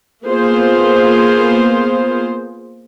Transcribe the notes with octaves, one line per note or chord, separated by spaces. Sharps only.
A#3 B3 F4 G#4 C5